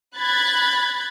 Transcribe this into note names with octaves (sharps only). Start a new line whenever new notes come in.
B5 F#6 G#6 A6